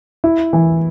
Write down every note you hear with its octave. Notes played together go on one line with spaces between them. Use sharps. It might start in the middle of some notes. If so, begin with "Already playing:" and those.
E4
E3